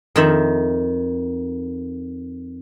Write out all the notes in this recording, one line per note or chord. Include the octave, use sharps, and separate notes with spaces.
F2 D#3 E5